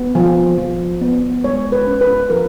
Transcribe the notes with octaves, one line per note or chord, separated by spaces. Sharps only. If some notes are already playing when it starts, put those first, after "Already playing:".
Already playing: B3
F3
F3
B3
G#3 C#5
B4
C#4
B4
F3 A#4